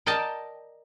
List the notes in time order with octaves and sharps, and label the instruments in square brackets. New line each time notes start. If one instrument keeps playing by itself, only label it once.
[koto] A#4 D5 D#5 G5 A5